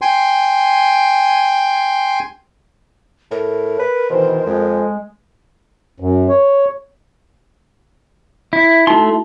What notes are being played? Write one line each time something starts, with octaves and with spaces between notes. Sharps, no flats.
G5 G#5 C6
A2 A#4
B4
B2 D#3 E3 C5
F2 G#3
F#2
C#5
E4
A3 D#4 E4 F#4 C6